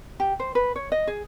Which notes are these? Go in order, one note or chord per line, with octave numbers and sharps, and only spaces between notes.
G4
C5
B4
C#5
D#5
G#4